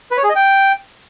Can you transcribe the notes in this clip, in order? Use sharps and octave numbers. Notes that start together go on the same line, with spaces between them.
B4
C#5
G#4
D#5
G5